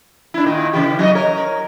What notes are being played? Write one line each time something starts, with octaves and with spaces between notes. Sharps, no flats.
D4 E4
A#2 D#3
C#3 E3 G4
F#3 D#5
A#4 C#5
A#4